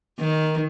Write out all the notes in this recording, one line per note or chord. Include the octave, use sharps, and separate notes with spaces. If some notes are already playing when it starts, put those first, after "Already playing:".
D#3